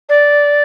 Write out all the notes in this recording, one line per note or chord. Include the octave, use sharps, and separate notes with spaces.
D5